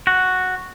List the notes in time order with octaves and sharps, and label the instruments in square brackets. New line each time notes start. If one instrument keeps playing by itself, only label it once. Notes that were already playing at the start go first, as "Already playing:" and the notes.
[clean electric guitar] F#4